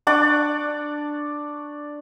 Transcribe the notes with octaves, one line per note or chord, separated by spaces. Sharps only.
D4 D5 C#6 D6